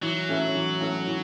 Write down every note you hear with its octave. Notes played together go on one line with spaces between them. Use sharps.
E3 F#3
A3 C#4 E4
E3
A3 C#4 E4
E3